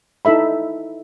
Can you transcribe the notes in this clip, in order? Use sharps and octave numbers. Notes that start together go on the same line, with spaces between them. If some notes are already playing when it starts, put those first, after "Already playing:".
D#4 E4 A4 E5 B5